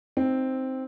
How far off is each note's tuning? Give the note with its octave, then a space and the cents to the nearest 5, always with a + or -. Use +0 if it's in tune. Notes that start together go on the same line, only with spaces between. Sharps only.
C4 +0 D#4 +0